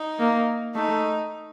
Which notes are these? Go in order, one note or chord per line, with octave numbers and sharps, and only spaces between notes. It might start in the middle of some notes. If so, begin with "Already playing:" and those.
Already playing: D#4
A#3
A3 D#4